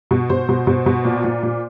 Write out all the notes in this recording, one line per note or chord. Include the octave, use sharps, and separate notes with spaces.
B2
B2 C5
B2
B2
B2
A#2
A#2
A#2